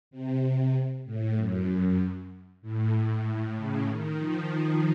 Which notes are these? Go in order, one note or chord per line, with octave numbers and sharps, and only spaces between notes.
C3
A2
F#2
A2
A2
C#3
D#3
F3